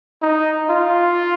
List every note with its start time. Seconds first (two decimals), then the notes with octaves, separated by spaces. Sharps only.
0.22 D#4
0.70 F4